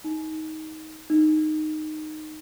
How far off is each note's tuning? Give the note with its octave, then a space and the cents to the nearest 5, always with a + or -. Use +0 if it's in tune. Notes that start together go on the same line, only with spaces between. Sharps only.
D#4 +15
D#4 -10